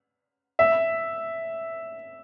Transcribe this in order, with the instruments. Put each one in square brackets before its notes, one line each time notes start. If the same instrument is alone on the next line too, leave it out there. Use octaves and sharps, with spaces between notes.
[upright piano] E5